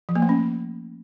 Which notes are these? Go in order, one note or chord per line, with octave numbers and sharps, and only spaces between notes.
F3
A#3
A3
C#4